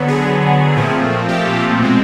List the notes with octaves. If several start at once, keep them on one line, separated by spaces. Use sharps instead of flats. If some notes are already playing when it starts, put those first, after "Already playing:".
Already playing: D3 F#3 B3
G#4
A#2 F3 A3 C4
G4
B2 G#3 C4